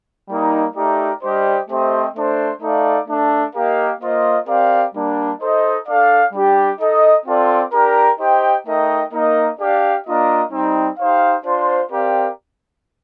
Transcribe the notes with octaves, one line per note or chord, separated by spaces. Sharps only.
G3 A#3 D#4
A3 D#4 G4 A#4 D5
G3 D4 G4 C5 D#5
A3 C4 G4 C5 D#5
A3 D4 A4 C5
A3 D#4 A4 D5 F5
A3 D4 A4
A#3 D#4 G4 A#4 F5
A#3 F4 C5 D#5
C4 G4 A#4 D5 F5
G3 A#3 D4
D#4 A4 C5 D#5
D4 A4 D5 F5
G3 D4 G4 D5
D#4 A4 D#5
C4 F4 A4 D5
D4 G4 A#4
D#4 G4 C5 G5
A3 D#4 A#4 D#5 G5
A#3 D#4 A#4 D#5
D4 G4 D5 F5
A#3 D4 F4 A#4 D#5
G3 C4 D#4
D#4 G4 C5 F5
D4 F4 C5
C4 G4 A#4 D5 F5